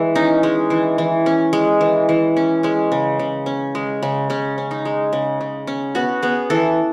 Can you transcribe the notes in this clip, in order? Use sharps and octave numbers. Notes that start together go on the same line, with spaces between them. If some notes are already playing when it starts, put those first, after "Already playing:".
Already playing: E3 G#3
C#4 D#4
G#3
E3
E3
C#4
G#3
E3
E3
C#4
G#3 C#4
C#3
C#3
C#4
G#3
C#3
C#3 C#4
C#4
D#4
G#3
C#3
C#3
C#4
B3 F#4
B3 G#4
E3 A4